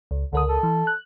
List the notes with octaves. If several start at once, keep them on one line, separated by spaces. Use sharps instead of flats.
C#2
C#2 D3 A#4 D#6
A4
E3
F#6